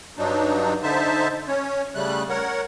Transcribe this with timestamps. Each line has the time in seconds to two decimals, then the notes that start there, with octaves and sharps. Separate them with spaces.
0.18 G2 F#3 D4 D#4
0.83 D3 D#4 C5 E5 A5
1.48 C#4 C#5
1.95 C#3 G3 A3 F#6
2.30 A#4 C#5 F#5